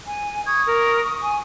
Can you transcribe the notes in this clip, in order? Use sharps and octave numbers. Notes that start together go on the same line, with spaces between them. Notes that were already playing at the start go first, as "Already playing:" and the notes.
G#5
C#6 D#6 G#6
A#4
G#5